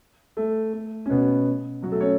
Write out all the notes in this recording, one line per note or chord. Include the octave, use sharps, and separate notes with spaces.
A3 A4
A3
C#4
B2 B3
F#3 F#4
A3 A4
C#4 C#5